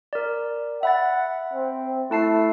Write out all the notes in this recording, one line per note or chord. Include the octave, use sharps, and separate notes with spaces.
A#4 D5
E5 F#5 B5 A6
C4
A3 E4 A5 C7